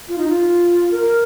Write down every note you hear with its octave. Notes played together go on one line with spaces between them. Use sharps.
F4
D#4
F4
A#4